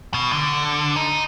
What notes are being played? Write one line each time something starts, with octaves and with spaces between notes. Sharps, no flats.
B2
D3
D#4